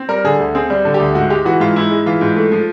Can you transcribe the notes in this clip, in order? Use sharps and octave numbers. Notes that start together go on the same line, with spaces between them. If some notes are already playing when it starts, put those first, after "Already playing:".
Already playing: C4
G3 A#4
D3 G#4
D2
C4 G#4
G3
D3
G4
D2
G#2 F#4
G#3 G4
E3 F#4
G#2 F4
G#2 E4
G#3
E3 F4
G#2
A3
F3